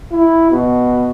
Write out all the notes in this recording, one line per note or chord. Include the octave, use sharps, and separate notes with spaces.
E4
B2